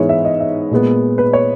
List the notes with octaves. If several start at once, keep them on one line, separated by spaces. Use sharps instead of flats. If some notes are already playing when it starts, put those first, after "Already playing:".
Already playing: G#2 E3 G#3 B3 C#5
E5
D#5
E5
A#2 G#3 B3
B4
C#5